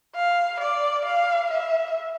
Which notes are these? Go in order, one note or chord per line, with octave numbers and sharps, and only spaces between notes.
F5
D5
F5
E5